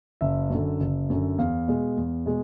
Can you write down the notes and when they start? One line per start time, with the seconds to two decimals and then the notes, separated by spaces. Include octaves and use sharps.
0.21 F#1 E5
0.50 F#2 D3
0.80 F#1
1.10 F#2 D3
1.38 E2 F5
1.68 B2 G#3
1.97 E2
2.26 B2 G#3